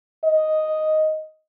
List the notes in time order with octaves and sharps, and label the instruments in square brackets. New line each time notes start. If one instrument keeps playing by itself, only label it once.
[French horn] D#5